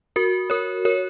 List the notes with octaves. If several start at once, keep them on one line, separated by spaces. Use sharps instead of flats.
F#4 A#4
A#4 C#5
A#4 C#5